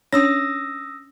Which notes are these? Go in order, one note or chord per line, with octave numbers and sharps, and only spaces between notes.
C#4 D4 C#5 D#6 E6 A#6